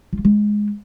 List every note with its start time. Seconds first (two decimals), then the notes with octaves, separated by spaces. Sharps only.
0.13 F4
0.19 A#3
0.25 G#3